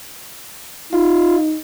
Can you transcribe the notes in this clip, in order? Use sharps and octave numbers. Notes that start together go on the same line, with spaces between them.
D#4 F4